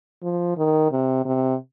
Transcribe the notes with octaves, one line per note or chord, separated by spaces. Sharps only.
F3
D#3
C3
C3